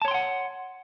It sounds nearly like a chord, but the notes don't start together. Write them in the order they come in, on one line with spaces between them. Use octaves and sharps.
A5 C#5 C6 G5 F#5